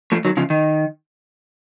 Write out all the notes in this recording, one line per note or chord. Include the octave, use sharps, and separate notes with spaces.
F3 A3
D#3 F#3
C#3 F3
D#3